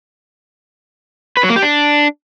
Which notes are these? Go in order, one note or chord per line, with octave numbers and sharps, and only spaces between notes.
B4
F#3
A#3
G4
D4